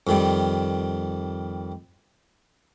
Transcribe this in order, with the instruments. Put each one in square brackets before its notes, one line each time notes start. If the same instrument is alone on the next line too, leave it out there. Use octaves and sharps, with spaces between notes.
[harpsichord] F2 D#3 G3